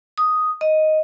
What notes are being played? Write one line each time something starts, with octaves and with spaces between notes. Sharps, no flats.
D#6
D#5